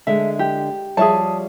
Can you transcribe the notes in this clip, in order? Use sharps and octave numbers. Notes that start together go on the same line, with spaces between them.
D3 G#3 E5
G4
F3 G3 G#4 C#5 E5 A5